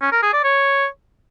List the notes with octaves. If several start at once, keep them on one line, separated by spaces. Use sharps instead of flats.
C#4
A#4
G#4
D5
C#5